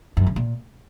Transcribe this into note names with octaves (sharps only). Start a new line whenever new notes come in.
F#2
C#3
A#2